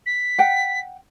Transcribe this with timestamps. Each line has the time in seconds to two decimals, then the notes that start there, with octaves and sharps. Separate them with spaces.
0.06 B6
0.38 F#5 G5